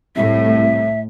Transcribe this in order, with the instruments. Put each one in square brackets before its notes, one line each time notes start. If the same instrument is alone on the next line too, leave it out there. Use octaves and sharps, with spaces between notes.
[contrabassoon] C2 [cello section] A2 [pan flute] E5